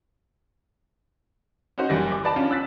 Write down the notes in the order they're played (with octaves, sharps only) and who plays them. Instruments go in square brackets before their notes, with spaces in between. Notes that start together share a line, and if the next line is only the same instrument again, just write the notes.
[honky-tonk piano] C#4 D#4 F#4 C5
F#1 E3 G3 A#6
D6
B4 D5 A5 B5
C#4 D4 F4
E6 F#6 A6 B6